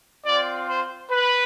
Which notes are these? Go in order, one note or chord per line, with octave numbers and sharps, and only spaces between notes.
C4 F4 D5
C5
B4